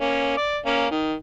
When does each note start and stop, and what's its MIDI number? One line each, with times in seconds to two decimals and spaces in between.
0.01 0.37 58
0.01 0.37 61
0.37 0.58 74
0.37 0.58 86
0.66 0.87 58
0.66 0.87 61
0.91 1.14 51